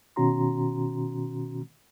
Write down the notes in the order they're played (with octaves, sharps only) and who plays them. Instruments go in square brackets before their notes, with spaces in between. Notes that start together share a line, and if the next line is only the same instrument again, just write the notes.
[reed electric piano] B2 D#3 C#4 F#4 A#5 C6